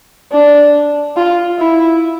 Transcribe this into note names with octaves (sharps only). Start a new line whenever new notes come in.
D4
F4
E4